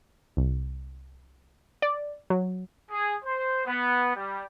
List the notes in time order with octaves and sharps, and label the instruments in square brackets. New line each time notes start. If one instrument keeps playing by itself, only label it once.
[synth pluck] C2
D5
F#3
[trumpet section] G#4
C5
B3
G3